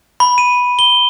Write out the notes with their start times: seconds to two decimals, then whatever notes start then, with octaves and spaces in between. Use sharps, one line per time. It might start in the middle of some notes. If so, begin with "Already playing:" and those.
0.20 B5
0.38 D#7
0.79 G7